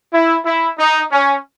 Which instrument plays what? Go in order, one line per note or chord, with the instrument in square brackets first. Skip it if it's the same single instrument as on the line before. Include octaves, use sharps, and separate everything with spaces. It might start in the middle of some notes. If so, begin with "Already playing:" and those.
[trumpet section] E4
E4
D#4
C#4